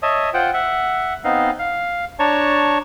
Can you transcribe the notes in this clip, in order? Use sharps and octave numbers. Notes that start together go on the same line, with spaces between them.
C#5 D#5 E5 A5 D#6
F4 C5 F#5 G5
E5 F#5
B3 C4 D#4 D#5 F5
F5
D4 C#5 A5 A#5 C#6